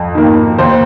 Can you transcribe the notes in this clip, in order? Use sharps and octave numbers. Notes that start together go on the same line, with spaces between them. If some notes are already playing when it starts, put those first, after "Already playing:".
Already playing: F2
D#3 A#3
D#2 C5